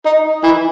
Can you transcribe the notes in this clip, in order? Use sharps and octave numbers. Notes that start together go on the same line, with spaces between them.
D#4
E3